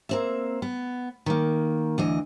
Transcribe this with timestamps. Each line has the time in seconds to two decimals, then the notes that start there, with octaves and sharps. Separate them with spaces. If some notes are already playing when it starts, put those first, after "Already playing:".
0.09 A#3 C4 E5
0.62 B3
1.26 D#3 A#3
1.98 D2 E3 D#5